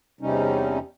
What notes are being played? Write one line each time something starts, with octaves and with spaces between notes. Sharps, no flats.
E2 C3 G3 C#4 D#4